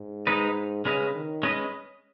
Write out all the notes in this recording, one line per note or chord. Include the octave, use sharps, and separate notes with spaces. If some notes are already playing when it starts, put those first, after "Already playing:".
Already playing: G#2
G#3 D#4 B4 D#5
C#3 G#3 C#4 B4 D#5
D#3
G#3 C#4 B4 D#5